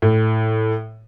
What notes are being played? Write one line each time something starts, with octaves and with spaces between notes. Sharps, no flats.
A2